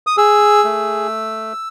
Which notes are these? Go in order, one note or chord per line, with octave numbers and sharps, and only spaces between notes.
D#6
G#4 E6
A3